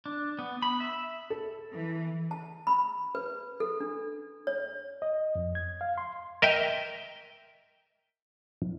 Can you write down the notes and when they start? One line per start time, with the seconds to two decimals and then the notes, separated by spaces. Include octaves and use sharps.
0.06 D4
0.39 B3
0.62 B5
0.80 E5
1.30 A4
1.73 E3
2.31 A5
2.67 B5
3.15 B4
3.60 A4
3.80 D4
4.47 C#5
5.02 D#5
5.35 F2
5.55 G#6
5.81 F5
5.98 C6
6.42 A#4 D#5 E5 G5